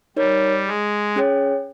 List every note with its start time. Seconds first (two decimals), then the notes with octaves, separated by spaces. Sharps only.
0.16 G3 D#4 A#4 C#5
0.67 G#3
1.16 C#4 G#4 C#5 G5